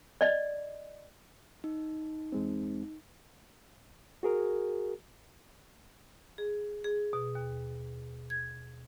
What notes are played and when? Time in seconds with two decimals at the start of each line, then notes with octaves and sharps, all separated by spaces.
0.21 D5 D#5
1.64 D#4
2.32 E2 G#3 C4
4.23 F#4 G#4 A#4
6.38 G#4
6.84 G#4
7.13 B2
7.35 D#2
8.30 G#6